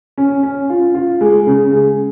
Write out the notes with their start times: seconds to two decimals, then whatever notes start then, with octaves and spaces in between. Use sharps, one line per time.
0.18 C#4
0.43 C#4
0.70 F4
0.95 F4
1.21 G#3
1.47 C#3
1.72 G#3